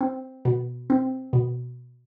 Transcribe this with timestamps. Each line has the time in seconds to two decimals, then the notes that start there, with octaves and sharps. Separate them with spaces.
0.01 C4
0.45 B2
0.90 C4
1.33 B2